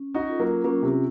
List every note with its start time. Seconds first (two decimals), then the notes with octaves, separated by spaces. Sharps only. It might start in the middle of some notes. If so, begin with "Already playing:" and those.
Already playing: C#4
0.14 D#4 F#4
0.27 F4 A4
0.40 F#3 A#3
0.64 F#3 A#3 C#4
0.83 C3